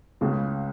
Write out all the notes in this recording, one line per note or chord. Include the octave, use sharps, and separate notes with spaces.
C#2 C#3 G#3